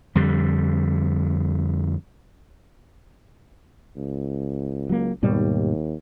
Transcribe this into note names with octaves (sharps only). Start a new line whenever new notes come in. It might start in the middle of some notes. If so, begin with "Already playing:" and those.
F2 D3 G3
C#2
F#3 A#3
D#2 G#2 B2 G3